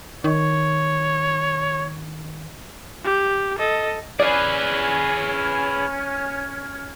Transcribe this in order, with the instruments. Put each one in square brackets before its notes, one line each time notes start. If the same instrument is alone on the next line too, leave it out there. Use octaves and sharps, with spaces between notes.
[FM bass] D#3 [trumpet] C#5
[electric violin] G4
A4 D#5
[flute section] C#4 F6 G#6 [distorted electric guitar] G#4 B4 [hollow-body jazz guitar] D5